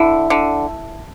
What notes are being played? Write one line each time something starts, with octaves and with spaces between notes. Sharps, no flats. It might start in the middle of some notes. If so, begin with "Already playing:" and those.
Already playing: D3 E4
D3